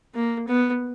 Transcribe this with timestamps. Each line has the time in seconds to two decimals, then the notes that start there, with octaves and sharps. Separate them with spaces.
0.15 A#3
0.48 B3